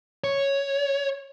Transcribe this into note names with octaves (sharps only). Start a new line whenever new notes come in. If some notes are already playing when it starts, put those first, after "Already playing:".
C#5